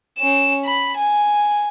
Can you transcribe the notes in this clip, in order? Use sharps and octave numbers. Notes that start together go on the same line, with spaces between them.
C#4 E7
B5
G#5